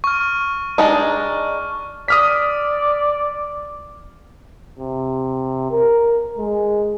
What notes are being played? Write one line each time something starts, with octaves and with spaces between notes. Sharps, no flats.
C#6 F6
G#3 D4 D#4
D5 D#6 F6 B6
C3
A#4
G#3